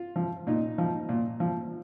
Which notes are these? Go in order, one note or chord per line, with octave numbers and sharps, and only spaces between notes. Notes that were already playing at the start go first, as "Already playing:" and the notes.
Already playing: F4
F3
A#2 D#4
F3
A#2
F3